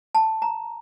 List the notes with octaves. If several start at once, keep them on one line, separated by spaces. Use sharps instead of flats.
A5
A#5